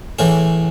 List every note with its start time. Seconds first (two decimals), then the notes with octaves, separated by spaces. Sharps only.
0.19 A2 E3 G#4